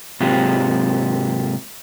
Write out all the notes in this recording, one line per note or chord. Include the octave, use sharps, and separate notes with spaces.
G#2 C3 F#3 F4 G4